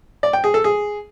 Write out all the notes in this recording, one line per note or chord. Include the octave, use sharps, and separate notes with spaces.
D5
G5
G#4
A4
G#4